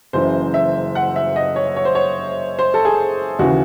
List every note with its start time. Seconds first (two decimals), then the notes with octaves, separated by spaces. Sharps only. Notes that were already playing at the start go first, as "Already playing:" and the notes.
0.13 F#1 F#2 C#3 E3 C5
0.54 E5
0.95 F#5
1.16 E5
1.36 D#5
1.56 C#5
1.76 C#5
1.85 C5
1.95 C#5
2.59 C5
2.74 A4
2.85 G#4
3.39 D#2 C#3 E3 F#4